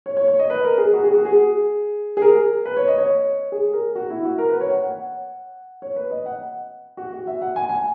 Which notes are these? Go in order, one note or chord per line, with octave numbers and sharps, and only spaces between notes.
C#5
C#5
C#5
D#5
B4
A#4
G#4
F#4
G#4
F#4
G#4
G#4
A#4
B4
C#5
D#5
C#5
G#4
A#4
F#4
E4
F#4
A#4
B4
C#5
F#5
F#5
C#5
B4
D#5
F#5
F#4
F#4
E5
F#5
G#5
G#5